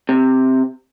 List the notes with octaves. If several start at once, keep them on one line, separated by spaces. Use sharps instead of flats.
C3